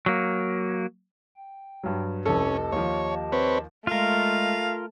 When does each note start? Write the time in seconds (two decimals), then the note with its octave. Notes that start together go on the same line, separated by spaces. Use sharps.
0.06 F#3 A#3
1.36 G5
1.84 G2 F#3
2.26 F1 C2 C#4 G4 A4 D#5 A5
2.72 D#2 F3 C#5
3.32 C4 B4 C#5
3.87 G#3 A3 F4 A#4 F5